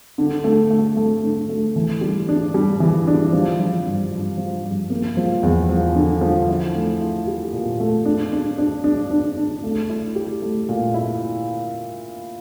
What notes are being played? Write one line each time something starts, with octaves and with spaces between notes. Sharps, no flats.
D3
A3
A3
A3
D3
A3
E3
G3
D4
G3
E3
D4
F3
F3
G2
G2
F3
G2
A#3
F3
E2
F3
D3
F3
E4
A3
E4
G4
A#2
A3
D4
D4
D4
D4
D4
D4
A3
E4
G4
A3
A#2
E4